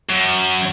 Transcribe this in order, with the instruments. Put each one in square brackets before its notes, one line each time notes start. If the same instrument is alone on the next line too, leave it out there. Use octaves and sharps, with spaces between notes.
[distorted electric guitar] F#2